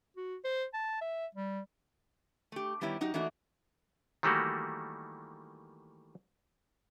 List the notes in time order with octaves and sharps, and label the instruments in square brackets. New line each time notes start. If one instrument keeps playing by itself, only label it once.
[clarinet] F#4
C5
A5
E5
G3
[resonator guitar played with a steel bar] A3 G4
D#3 G3 B3 E4 G4 C#5
F#3 D#4 F#4 G4
E3 A3 A#3 D4 D#4 F#4
[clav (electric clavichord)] D#3 E3 G3 A3 A#3 F#4